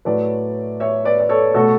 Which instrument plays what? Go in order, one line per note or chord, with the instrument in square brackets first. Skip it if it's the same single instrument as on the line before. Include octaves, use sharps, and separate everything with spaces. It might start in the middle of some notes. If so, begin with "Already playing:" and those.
[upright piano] A2 F#3 A3 B4 D5
C#5 E5
B4 D5
D5
A4 C#5
B2 A3 F#4 A4